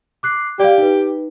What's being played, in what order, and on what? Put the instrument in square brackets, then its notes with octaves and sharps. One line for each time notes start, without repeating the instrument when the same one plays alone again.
[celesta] D6 F#6 C7
[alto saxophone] G4 [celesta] D5 F5
[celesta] D#4 B4